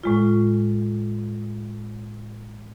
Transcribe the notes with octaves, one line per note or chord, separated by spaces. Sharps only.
A2 G#3 F4